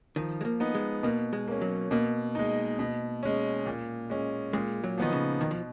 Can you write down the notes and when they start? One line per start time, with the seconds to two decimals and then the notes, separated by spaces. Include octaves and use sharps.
0.16 D#3 F3
0.41 G#3
0.45 A#3
0.60 B3 D#4
0.75 G#3
1.03 B2 A#3
1.33 G#3
1.48 A#3 C#4
1.61 F#3
1.91 B2 A#3
2.35 G#3 D#4
2.79 B2
3.23 G#3 C#4
3.66 A#2
4.10 G#3 C#4
4.53 A#2 G#3
4.84 F#3
4.98 D#3 F3 B3 D#4
5.13 C#3
5.41 B2 D#3
5.51 F3